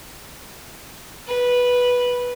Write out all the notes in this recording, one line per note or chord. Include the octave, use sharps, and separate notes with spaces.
B4